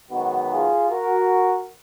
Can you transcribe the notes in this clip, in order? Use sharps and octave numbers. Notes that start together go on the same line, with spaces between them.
F#2 D#3 G#3 B3 D#4 F#4
F4 G#4
F#4 A#4